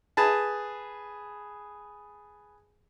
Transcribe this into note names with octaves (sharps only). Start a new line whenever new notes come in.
G#4 B4 A5